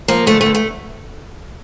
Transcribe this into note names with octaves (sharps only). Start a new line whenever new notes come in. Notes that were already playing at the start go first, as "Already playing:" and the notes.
F3 A#3
D3 A3
A3
E2
A3